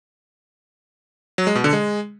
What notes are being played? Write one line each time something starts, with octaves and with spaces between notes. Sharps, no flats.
F#3
G#3
B2
D3
G#3